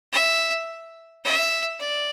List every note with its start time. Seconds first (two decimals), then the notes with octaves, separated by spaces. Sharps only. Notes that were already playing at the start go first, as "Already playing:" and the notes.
0.13 E5
1.24 E5
1.80 D5